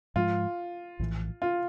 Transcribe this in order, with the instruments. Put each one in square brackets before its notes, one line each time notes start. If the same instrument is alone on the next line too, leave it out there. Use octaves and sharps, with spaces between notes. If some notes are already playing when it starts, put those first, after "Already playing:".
[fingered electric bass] G#2 F3 G#3 [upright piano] F4
[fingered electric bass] A#1 A2 E3
[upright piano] F4